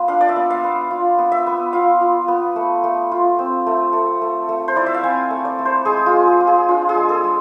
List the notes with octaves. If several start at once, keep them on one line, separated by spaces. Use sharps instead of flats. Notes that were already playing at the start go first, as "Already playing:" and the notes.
Already playing: B3 F4
D4 F5
D5
E5
B3
F5
B3
F4
B3
E5
B3
F4 F5
F4
B3
A3
A3
F4
C4
A3
A3
A3
A3
C5
E4 D5
E5
F5
C4 G#5
A3
D5
A3
C5
G#3 G#4
F4
G#3
G#4
F4
G#4
D4 F4
G#4
G#3
A4
G#3